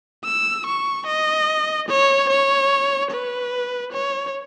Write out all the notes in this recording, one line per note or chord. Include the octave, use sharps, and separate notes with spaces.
E6
C#6
D#5
C#5
C#5
B4
C#5